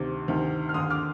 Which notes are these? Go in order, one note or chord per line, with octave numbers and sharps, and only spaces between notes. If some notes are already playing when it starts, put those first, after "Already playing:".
Already playing: D2 C3 D#3 D6
D2 C3 D#3
F6
D#2 D3 C6 D#6
D6 F6